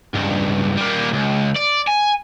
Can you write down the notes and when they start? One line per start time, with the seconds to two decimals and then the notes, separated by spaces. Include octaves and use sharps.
0.14 C#2 G2
0.77 G3 A#3
1.13 C#2
1.56 D5
1.87 G#5